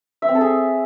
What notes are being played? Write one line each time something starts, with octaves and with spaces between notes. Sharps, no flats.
E5
C4
A4
G#4